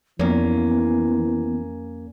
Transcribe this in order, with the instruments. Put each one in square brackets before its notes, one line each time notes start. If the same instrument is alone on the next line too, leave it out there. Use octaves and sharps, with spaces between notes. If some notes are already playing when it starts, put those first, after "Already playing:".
[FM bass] F2 [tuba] E3 [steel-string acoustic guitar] A#3 C#4 [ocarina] B3